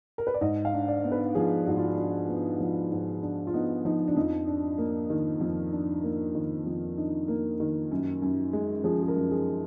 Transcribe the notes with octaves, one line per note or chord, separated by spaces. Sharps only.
A#4
B4
D5
G#2 D#5
F5
D4
D5
B3
B4
F3 G#4
G#2 F#4
F4
F#4
D4 F4
B3
F3
G#2
D4
F4
B3 D#4
F3 D#4
D4
F2 D#4
D4
A#3
D#3
F2
D4
A#3
D#3
F2
D4 D#4
A#3
D#3
F#2
F#2
G#3
F3 G#4
G#4
A#4
F#2
G#4